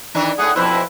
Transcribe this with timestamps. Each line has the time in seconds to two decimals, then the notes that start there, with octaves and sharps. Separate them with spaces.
0.15 D#3 E3 D4
0.39 A2 A3 G#4 F#5 D#6
0.56 F2 B2 E4 B4 C5